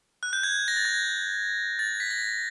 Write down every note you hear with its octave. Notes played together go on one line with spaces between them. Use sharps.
F#6
G6
G#6
A#6
A6
G#6
A6
B6
A#6